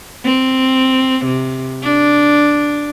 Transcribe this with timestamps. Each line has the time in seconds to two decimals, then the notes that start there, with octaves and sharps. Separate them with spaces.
0.24 C4
1.25 C3
1.82 D4